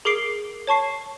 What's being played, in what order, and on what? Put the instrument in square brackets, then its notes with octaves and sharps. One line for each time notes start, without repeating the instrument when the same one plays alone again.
[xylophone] G#4 A#4 D6 C7 D7
C#5 A5 C#6 C7